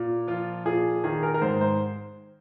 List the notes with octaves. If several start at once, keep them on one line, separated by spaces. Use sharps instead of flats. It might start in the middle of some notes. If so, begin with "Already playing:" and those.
Already playing: A#2
F3 F4
A#2 G#4
D#3 G#4
A#4
A#4
G#2 C5
C5